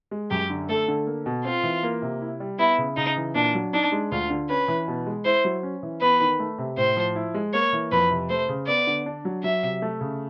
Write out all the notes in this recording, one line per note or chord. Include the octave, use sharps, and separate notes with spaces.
G#3
F#2 G4
D3
A3 A4
D3
A#3
B2
C4 F4
E3
A#3
C3
E4
G3
B3 E4
C#3
C#3 D#4
E3
A#2 D4
F#3
D4 D#4
G#3
D2 F4
D3
C#4 B4
E3
B2
G#3
E4 C5
F#3
C#4
E3
B3 B4
D#3
A3
C3
A2 C5
F3
E4
G#3
A#3 C#5
E3
F2 B4
C3
A3 C5
C#3
B3 D5
D3
D4
F#3
F#3 E5
C3
A3
C#3